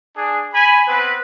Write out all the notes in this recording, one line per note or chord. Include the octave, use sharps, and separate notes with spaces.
D4 G#4
G#5 B5
B3 C4 B4